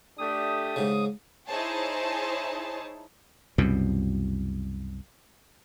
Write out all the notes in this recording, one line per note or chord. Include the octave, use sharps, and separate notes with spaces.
A3 D4 G4 D#6
G#2 C#3
D#4 E4 G#4 C5 C#5 A5
C2 F#2 B2